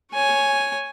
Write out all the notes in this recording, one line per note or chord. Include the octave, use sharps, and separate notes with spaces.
C#5 G#5